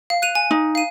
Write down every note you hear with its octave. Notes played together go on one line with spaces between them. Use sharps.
F5
F#6 D#7 F7
G#5
D#4
F5 D#7